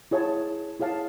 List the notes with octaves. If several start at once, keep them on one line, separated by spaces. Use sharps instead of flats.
E4 G#4 C#5 F5 A5
E4 G#4 C#5 F5 A5